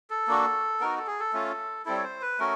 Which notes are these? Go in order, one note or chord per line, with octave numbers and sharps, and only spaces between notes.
A4
A#3 D4 F#4
B3 D#4 F#4 A#4
A4
G#4
A4
A3 C#4 F4
G3 C4 E4 A4
C#5
C5
B4
A3 C#4 F#4 A#4